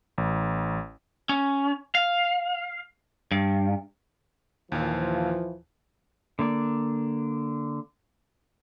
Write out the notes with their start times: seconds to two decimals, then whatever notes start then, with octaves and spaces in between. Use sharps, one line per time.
0.18 A1
1.29 C#4
1.95 F5
3.32 G2
4.72 D#2 A#2 E3 F3 F5
6.39 D3 A#3 D5